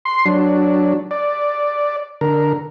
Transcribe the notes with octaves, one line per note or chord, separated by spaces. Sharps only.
C6
F#3 D4
D5
D3 A#4